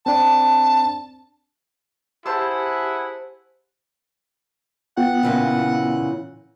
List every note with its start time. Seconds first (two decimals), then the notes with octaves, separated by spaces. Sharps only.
0.06 C4 D4 A5
2.26 E4 G4 G#4 C5 F#5 A5 E6
4.97 B3 F4 F#5 G5
5.23 A#2 C#3 E3